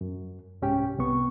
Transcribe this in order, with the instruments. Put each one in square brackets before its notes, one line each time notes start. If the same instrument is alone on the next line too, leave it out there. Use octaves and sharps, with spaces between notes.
[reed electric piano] F#2
C2 G#2 C#4 G4 G5
C2 B3 C#6